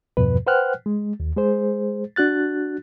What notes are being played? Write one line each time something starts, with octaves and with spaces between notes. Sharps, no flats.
E2 G2 B2 F3 B4
B4 C5 F#5 G5 F6 F#6
G#3
D#2
G#3 G#4 C5
D4 F#4 F#6 A6